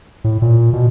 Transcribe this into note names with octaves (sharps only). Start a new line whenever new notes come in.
A2
A#2
B2